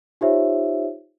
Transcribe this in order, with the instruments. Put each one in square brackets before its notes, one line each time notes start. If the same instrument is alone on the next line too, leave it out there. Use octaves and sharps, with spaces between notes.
[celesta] D#4 F4 G4 C5 C#5 E5